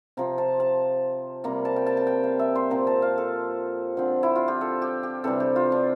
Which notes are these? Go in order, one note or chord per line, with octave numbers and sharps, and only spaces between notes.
C3 F3 C4 A#5
A5
A5
C3 G3 A#3 A#5
A5
G5
A5
A5
G5
F5
E5
C6
A#2 F3 C4 A#5
A5
F5
A4
D3 F3 C4
E4
F4
G4
A4
G4
G4
C3 E3 G3 D4 A4
G4
F4
D4